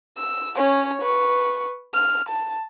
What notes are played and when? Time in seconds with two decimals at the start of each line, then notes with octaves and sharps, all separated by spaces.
0.17 E6
0.57 C#4 C#5
1.02 B4 C#6
1.94 F6
2.29 A5